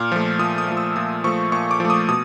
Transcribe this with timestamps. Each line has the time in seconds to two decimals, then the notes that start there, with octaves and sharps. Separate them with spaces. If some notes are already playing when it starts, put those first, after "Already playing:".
Already playing: A#2 F6
0.12 F3 A3
0.39 A#2 D#6
0.58 D#6
0.68 F3 A3
0.77 E6
0.96 A#2 D#6
1.24 F3 A3 C#6
1.52 A#2 C#6
1.71 D6
1.80 F3 A3
1.90 D#6
2.08 B2 D#6